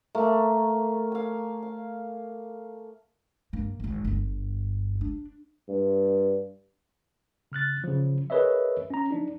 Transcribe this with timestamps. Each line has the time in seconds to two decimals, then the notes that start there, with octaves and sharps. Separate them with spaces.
0.15 A3 A#3
1.12 F5 G#5
1.63 F5
3.53 G2 A#3
3.80 D1 G#1
4.05 G1 G2
5.01 D4
5.69 G2
7.52 C#3 F6 F#6 A6
7.84 C#3 F3
8.30 G#4 A#4 B4 C#5 D#5 E5
8.90 C#4 A#5
9.11 F3 D4 D#4